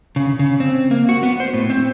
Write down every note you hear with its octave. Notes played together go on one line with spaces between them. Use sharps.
C#3
C#3
C4
A#3
F#4
B3
C5
A2
C4